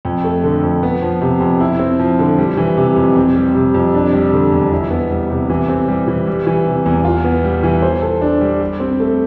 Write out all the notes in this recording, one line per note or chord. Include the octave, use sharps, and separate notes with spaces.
F2
A3
D3
F2
B3
F3
C3
F2
E4
C4
F3
D3
G3
E3
C3
F2
C4
G3
C3
F2
D4
G3
D3
E2
E4
B3
G3
C3
E3
C4
G3
E3
G3
E3
C3
E2
F4
B3
G3
E3
C5
A4
D4
G3
G4
C4
A3